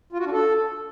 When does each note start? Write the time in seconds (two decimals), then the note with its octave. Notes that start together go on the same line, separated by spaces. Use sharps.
0.13 F4
0.19 F#4
0.26 D4
0.32 A4